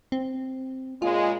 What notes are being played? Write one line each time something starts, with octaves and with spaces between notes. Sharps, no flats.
C4
A#2 C#3 G#3 F4